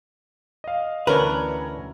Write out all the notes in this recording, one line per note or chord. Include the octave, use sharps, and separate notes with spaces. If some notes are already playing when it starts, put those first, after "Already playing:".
D#5 F5
D2 E3 C#4 D4 A#4 B4 C#5